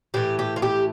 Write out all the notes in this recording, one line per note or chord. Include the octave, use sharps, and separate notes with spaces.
A2 E3 A3 G4
G4
F4
G4